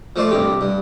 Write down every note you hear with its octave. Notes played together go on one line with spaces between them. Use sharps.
F3 A3 C5 D5
C2 G2 G4 D6
G2